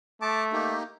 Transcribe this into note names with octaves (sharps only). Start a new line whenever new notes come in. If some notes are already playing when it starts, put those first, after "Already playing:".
A3 A5 D6
A#3 D#4 G4